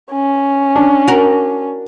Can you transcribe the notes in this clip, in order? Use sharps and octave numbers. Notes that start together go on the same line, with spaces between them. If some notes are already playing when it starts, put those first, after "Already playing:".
C#4
D4
F#4 A#4